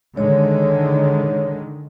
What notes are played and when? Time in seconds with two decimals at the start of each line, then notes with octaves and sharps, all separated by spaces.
0.17 D3 D#3 G#3 C#5